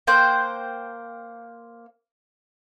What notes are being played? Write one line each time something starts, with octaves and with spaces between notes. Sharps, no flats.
A#3 C5 G5 F#6